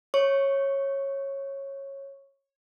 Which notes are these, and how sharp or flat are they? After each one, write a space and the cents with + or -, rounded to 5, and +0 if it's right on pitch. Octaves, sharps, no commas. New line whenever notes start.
C#5 -15 C#6 +0